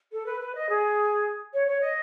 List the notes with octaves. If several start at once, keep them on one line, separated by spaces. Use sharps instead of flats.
A4
B4
B4
D#5
G#4
C#5
C#5
D#5